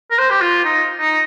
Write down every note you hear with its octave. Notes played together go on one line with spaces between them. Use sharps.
A#4
C5
G4
F4
D#4
D#4